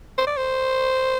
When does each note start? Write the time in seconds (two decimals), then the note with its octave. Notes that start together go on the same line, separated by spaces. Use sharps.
0.18 C5
0.27 D5
0.37 C5